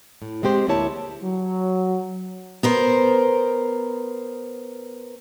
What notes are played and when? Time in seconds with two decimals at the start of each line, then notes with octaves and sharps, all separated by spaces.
0.22 A2
0.43 G#3 C4 G4 C5
0.68 D2 A#3 E4 C#5 A5
1.23 F#3
2.63 B3 A#4 C5